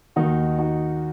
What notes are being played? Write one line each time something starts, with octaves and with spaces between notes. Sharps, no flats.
D#2 D#3 D#4 F#4
D#4 F#4